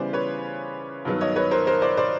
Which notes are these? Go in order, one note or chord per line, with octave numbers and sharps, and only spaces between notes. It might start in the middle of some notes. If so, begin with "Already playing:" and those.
Already playing: C#3 E3 G3 B3 C5 D5
B4 C#5
G2 D#3 F#3 B3
C#5 D#5
B4 C#5
A#4 C5
A#4 C5
C5 D5
C5 D5